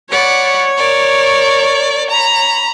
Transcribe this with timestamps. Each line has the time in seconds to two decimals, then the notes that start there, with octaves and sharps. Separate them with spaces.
0.10 C#5 D5 F#5 B5
0.77 A#4 D5
2.10 A#5 B5